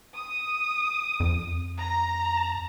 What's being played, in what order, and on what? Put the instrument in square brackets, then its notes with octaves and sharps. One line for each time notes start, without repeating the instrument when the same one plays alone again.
[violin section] D#6
[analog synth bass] F2
[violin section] A#5